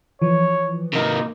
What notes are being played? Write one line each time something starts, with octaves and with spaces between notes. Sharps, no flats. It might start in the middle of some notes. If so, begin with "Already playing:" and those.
E3 F3 C#5
C3 A#3 D#4